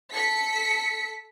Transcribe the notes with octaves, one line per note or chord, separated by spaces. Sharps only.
A4 B6 C#7